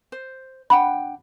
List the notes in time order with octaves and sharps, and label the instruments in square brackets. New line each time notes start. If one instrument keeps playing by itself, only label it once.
[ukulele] C5
[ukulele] D4 F#5 G5 [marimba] B5